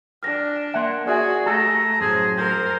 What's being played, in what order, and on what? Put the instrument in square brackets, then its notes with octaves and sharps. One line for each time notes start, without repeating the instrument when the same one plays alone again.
[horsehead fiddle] D4 [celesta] F6 A#6
[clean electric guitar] A#3 F#5 [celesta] E5 C6
[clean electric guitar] C#4 [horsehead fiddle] F#4 [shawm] G#4 [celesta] D5 E5 G#5
[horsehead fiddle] A3 [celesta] G4 [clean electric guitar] A4 [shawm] A#5
[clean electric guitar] F#2 A2 F#3 [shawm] G#4 [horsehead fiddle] C5
[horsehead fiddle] A#4 [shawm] C5